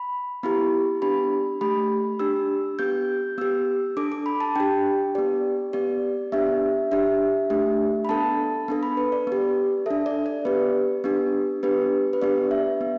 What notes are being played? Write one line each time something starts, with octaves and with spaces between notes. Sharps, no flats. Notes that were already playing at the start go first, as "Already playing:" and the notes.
Already playing: B5
B3 E4 G4 B5
B3 D4 G4 B5
A3 G4 B5
D4 G4 E6
B3 G4 G6
B3 G4 E6
D4 A4 D6
D6
B5
A5
D4 G4 G5
B3 G4 D5
B3 G4 D5
B3 D4 G4 E5
D4 G4 E5
A3 D4 G4
B5
B3 D4 A4 A5
B3 D4 A4
B5
B4
D5
B3 G4
D4 A4 E5
D5
D5
B3 G4 B4
B3 D4 G4
B3 D4 G4 B4
B4
B3 D4 G4 D5
E5
B3